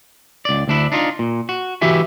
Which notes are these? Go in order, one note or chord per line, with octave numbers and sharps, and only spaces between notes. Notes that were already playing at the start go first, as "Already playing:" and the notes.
C#2 D5
D2 D4 E4
D4 D#4 F4
A#2
F#4
E3 E4 F#4 G4 E5 G#5